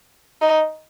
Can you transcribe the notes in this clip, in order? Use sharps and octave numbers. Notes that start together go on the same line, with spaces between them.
D#4